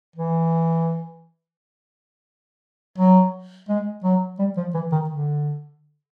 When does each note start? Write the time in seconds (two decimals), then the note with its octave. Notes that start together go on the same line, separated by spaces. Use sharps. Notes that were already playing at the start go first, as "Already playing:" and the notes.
0.16 E3
2.99 F#3
3.69 G#3
4.04 F#3
4.39 G3
4.57 F3
4.74 E3
4.92 D#3
5.10 D3